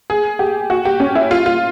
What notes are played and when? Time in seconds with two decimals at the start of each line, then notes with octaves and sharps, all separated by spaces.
0.10 G#4
0.39 G4
0.70 F#4
0.85 G4
1.00 C#4
1.15 E4
1.31 F4
1.46 F4